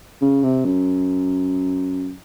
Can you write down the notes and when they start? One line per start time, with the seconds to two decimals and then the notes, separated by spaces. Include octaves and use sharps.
0.21 C#3
0.43 C3
0.65 F#2